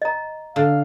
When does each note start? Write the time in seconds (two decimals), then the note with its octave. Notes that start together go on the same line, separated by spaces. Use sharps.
0.02 D#5 A#5
0.56 D3 F5